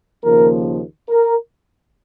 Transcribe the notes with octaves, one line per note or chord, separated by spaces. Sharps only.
D#2 C#3 F3 A#3 A#4
A#4